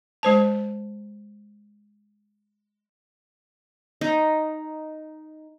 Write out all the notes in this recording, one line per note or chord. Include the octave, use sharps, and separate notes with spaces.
G#3 C5 A5
D#4